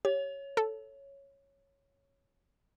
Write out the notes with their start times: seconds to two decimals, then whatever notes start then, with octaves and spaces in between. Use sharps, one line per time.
0.05 G4 C#5
0.57 A4